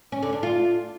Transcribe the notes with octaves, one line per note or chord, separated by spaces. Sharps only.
C#4
D3
D4
F4